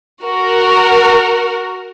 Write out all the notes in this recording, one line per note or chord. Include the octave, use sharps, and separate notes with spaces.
F#4 A#4